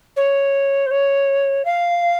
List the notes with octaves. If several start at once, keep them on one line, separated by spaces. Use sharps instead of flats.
C#5
C5
C#5
F5